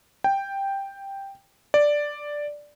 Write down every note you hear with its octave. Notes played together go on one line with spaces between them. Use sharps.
G5
D5